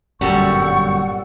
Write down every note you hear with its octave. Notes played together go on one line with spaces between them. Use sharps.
G1 F#2 A#2 G3 A4 F#5 C#6